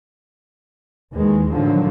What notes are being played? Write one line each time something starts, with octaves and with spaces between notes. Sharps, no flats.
D#2 D#3 E3 G#3
A2 D3 D#3 F3 F#3